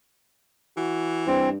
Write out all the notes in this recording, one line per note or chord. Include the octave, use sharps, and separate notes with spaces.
E3 F#4
G2 C4 C5